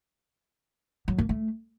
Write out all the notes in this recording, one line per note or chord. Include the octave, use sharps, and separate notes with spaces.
F#3
A#3
A3